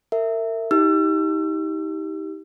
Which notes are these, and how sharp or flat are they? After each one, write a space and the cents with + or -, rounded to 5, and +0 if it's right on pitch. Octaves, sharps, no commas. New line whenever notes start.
A#4 -35 E5 +0
D#4 +35 G4 +0 E6 +35